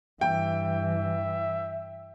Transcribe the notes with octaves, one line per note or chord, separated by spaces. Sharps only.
G2 E3 E5 G5